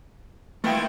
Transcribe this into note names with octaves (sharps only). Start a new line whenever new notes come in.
D#3 A3 E4 F4 B4 G5